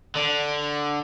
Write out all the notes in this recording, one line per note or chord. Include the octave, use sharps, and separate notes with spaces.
D3